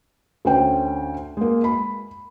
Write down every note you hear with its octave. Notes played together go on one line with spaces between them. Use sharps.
D2 C#4 C5 G5
G#3 A#3
B5